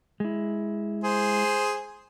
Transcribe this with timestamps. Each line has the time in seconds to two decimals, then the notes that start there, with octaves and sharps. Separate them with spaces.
0.20 G#3 E4
1.04 G#4 C5